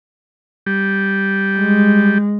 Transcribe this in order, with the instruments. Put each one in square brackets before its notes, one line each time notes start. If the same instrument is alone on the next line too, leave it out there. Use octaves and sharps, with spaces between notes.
[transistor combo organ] G3
[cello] G#3